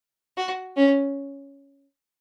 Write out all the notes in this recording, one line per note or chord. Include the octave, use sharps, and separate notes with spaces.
F#4
C#4